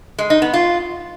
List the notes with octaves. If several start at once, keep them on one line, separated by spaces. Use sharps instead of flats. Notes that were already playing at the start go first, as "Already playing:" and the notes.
G#3
D#4
B3
F4